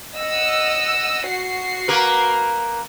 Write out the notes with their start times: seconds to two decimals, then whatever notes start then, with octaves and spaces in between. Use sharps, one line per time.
0.19 D#5 F#5 E6
1.28 F#4 C7
1.88 A#3 A#4 B4